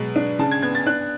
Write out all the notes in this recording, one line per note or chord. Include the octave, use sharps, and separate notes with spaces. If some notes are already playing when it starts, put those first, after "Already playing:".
Already playing: B2 F#3 G#3
D4
C#3 A5
G#6
B3 G#6
A6
D4 F#6